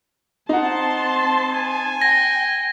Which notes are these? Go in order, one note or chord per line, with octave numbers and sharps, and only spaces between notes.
C4 D#4 F#5 A5 C6
G#5
G5 A#6